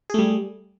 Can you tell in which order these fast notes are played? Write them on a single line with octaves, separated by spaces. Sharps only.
G#4 A3 G3